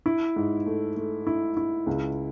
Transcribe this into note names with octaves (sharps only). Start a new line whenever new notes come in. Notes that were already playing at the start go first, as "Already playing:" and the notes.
E4
G#2
A3
A3
E4
E4
C#2